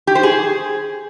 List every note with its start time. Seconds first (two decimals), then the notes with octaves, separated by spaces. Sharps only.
0.07 G4
0.15 C5
0.23 G#4